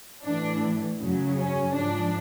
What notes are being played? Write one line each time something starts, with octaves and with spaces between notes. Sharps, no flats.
A2 E3 D4
F#2 C#3 F#3
C#4
G#2 F3 D4